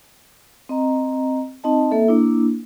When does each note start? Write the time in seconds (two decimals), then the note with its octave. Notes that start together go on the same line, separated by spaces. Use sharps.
0.69 C4 D#5 A#5
1.64 C4 D#4 D#5 A5
1.91 A#3 A4 E5
2.08 A#3 D4 E4